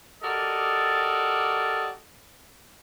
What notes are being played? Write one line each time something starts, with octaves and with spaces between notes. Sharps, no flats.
F#4 G4 A4 A#4 D5 D#5